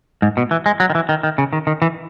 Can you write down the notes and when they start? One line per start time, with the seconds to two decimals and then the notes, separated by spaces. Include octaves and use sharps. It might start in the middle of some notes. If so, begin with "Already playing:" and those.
0.22 G#2
0.37 B2
0.51 E3
0.66 G#3
0.80 F#3
0.90 D#3
0.95 E3
1.09 D#3
1.23 D#3
1.38 C#3
1.53 D#3
1.67 D#3
1.82 E3